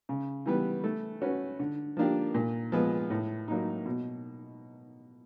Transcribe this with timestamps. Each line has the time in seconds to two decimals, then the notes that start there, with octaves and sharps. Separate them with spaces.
0.09 C#3
0.46 E3 G3 B3
0.84 A3
1.22 C#4 F#4 B4
1.59 D3
1.97 F3 A#3 D4 G4
2.34 A#2
2.72 F3 G#3 B3
3.10 A2
3.48 F#3 A#3 D#4
3.86 B2